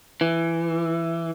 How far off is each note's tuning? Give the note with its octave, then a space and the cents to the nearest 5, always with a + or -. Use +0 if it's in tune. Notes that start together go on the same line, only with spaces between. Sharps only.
E3 +15